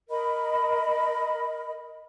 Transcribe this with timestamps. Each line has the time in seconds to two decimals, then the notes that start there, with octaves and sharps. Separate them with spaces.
0.10 A#4 D#5 B5